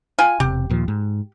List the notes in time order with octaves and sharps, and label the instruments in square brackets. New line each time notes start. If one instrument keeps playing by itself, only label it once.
[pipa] F4 G5 G#5
[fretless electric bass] E1 C3 [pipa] G4
[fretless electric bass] D#2 A#2 F3
G#2